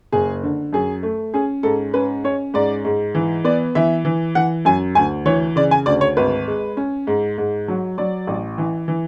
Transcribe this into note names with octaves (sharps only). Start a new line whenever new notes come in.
F#1 G#4
D3
F#2 G#4
A3
C#4 G#4
G#2 A4
C#4 B4
C#4 C#5
G#2 D5
G#2
E3
B3 D5
E3 E5
E3
E3 F#5
F#2 G#5
D2 G#5
E3 C#5
C#3 D5
G#5
D2 D5
C#5
G#1 B4
G#3
C#4
G#2
G#2
F#3
F#3 D5
A1
E3
E3